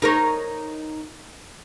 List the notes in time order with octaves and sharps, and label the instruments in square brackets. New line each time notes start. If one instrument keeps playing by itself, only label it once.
[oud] D#4 A#4 C#5